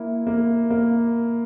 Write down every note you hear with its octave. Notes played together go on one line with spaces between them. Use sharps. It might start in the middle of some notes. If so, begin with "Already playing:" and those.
Already playing: A#3 E4
A#3
A#3